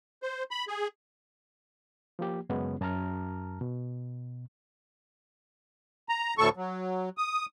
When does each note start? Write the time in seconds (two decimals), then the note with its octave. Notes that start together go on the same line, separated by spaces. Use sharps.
0.23 C5
0.51 B5
0.68 G#4
2.19 F3 A#3 G4
2.49 F#2 C#3 G#3 B3 C#4
2.80 F#2 A5 A#5 F6
3.61 B2
6.09 A#5
6.38 D2 A2 A4 C#6
6.57 F#3
7.18 D#6